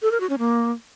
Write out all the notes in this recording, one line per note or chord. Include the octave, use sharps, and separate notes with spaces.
A4
A#4
F#4
C#4
A#3